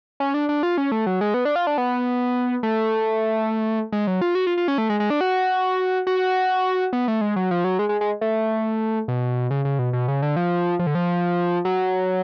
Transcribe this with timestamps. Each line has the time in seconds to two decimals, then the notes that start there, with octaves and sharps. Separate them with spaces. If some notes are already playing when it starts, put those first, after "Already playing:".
0.20 C#4
0.34 D4
0.49 D4
0.63 F4
0.78 C#4
0.92 A3
1.06 F#3
1.21 G#3
1.34 B3
1.45 D4
1.56 F4
1.67 D4
1.78 B3
2.63 A3
3.92 G#3
4.07 F#3
4.21 F4
4.35 F#4
4.47 F4
4.57 F4
4.68 C#4
4.78 A3
4.90 G#3
5.00 G#3
5.10 D4
5.21 F#4
6.07 F#4
6.93 B3
7.08 A3
7.21 G#3
7.36 F#3
7.51 F3
7.64 F#3
7.79 G#3
7.89 G#3
8.01 G#3
8.21 A3
9.08 B2
9.51 C#3
9.65 C#3
9.79 B2
9.93 B2
10.08 C#3
10.22 D3
10.36 F3
10.79 F3
10.87 D3
10.95 F3
11.65 F#3